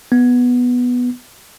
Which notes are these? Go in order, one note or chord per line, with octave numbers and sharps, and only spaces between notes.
B3